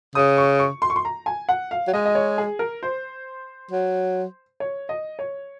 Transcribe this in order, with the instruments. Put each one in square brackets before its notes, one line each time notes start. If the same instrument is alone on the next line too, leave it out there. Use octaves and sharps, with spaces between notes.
[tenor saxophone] C#3 [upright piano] D#6
[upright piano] C#6
C#6
C6
C#6
C6
A#5
G#5
F#5
F5
[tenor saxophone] F#3
[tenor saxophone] G#3 [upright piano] D#5
[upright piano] D#5
C#5
G#4
A#4
C5
[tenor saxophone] F#3
[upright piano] C#5
D#5
C#5